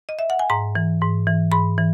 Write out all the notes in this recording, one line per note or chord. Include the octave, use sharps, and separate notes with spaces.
D#5
E5
F#5
G#5
G#2 A#5
E3
G#2
E3
G#2 B5
E3